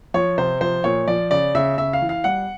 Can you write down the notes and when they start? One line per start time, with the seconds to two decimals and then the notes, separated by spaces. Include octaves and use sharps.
0.14 F3 C#5
0.38 C3 C5
0.61 F3 C5
0.84 A#2 C#5
1.08 F3 D5
1.31 C#3 D5
1.55 C#3 E5
1.78 C#3 E5
1.93 F5
2.02 E3
2.09 F5
2.24 G3 F#5